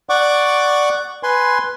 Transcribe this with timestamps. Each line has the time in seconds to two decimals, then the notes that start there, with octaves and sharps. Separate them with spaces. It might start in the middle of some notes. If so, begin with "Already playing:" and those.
0.09 D5 F#5 C#6 D6
1.23 B4 G#5 C6